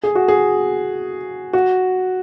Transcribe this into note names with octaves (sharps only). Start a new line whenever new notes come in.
G#4
F#4
G#4
F#4